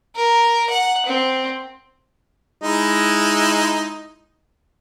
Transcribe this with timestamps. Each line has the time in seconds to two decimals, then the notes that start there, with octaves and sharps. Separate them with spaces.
0.16 A#4
0.70 F#5
1.06 C4
2.62 G#3 D#4 E4